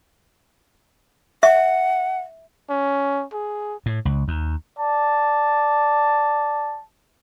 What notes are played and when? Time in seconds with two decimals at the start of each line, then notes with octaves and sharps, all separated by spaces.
1.43 E5 F#5
2.70 C#4
3.33 G#4
3.86 A2
4.05 C#2
4.28 D#2
4.79 D5 A5